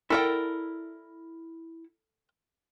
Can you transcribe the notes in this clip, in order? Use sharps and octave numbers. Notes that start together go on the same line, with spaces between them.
E4 A4 A#4 D5 F#5 G5